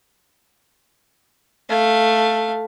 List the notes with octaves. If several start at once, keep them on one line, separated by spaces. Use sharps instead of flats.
A3 F5